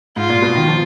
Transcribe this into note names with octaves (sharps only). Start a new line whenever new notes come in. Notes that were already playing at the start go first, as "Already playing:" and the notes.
G#2 F4
A#2
B2
D#3
F3